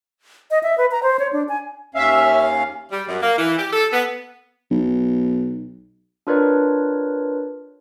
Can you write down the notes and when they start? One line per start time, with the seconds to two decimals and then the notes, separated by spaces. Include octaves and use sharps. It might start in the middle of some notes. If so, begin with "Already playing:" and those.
0.51 D#5
0.63 E5
0.78 B4
0.91 A#5
1.03 C5
1.19 C#5
1.33 D4
1.49 G#5
1.95 D#2 C#4 E5 F5
2.91 G3
3.08 F#2
3.22 A#3
3.38 E3
3.58 G4
3.73 A4
3.93 B3
4.71 B1
6.27 D4 F4 A#4 B4 C#5 D5